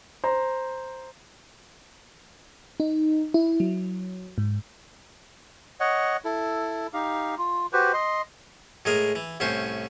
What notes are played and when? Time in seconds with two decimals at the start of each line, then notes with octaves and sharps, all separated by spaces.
0.24 C5 A#5
2.80 D#4
3.34 E4
3.60 F#3
4.38 G#2
5.80 C#5 D#5 F#5
6.25 E4 A4
6.94 D#4 G4 F5
7.38 F4
7.73 F#4 G4 B4 C5
7.93 D#5 C6
8.85 A2 G#3 G#4 A#4
9.15 E3
9.40 C2 A2 C#4 C5 G#5